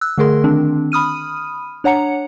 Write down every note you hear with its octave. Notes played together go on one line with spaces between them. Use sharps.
E6 F#6
D3 A3 G#4 A#4 C6
D#3 C4 D4
B5 D#6 F6 D#7
D4 C#5 F#5 A#5 C#7